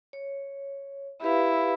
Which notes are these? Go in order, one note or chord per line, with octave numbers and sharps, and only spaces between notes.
C#5
E4 G4 B4 F5